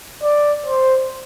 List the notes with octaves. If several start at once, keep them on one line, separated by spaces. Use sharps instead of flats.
D5
C5